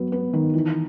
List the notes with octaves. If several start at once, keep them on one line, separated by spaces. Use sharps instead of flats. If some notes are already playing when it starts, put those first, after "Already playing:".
Already playing: F#3 B3
B3
D#3
E3